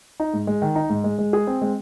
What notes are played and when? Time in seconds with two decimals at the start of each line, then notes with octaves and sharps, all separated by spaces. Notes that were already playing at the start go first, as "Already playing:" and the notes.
0.20 D#4
0.33 G#2
0.47 G#3
0.62 D#3
0.75 D#4
0.90 G#2
1.04 G#3
1.19 G#3
1.33 G#4
1.47 C4
1.62 G#3